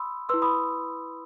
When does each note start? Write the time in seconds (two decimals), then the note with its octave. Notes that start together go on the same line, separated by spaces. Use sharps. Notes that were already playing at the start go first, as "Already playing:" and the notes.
Already playing: B5 C6 D#6 E6
0.29 E4 B4 C6 E6
0.42 B5 D#6